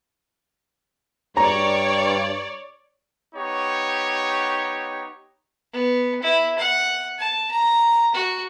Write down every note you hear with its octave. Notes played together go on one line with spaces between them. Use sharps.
G2 C#5 D5 A#5
B3 D#4 G4 C#5
B3
E4
F#5
A5
A#5
F#4